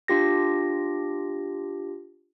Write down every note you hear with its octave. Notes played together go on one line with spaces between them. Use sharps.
D4 F4 G4 A#6